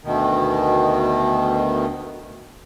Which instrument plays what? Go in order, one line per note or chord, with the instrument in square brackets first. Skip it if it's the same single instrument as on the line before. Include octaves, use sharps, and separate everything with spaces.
[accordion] D2 B2 D#3